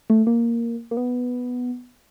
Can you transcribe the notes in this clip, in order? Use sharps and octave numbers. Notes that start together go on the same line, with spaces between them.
A3
A#3
A#3
B3